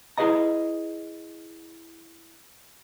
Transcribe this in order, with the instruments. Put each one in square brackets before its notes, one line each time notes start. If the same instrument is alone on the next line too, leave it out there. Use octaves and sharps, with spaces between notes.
[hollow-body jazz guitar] E4 G#4 B4 D#5 A#5